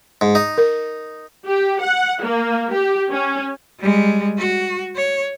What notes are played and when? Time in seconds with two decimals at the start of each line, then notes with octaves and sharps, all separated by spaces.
0.21 G#2
0.35 D#4
0.58 A#4
1.47 G4
1.82 F#5
2.22 A#3
2.73 G4
3.11 C#4
3.80 G3 G#3
4.39 F#4
4.96 C#5